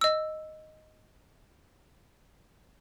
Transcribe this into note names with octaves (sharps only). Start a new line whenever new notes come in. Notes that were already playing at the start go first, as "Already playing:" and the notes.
D#5 E6